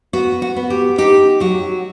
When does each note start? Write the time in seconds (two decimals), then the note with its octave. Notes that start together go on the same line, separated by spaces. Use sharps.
0.13 B3 F#4
0.42 F#4
0.56 B3
0.70 G4
0.98 D#4 G4
1.40 F#3 F#4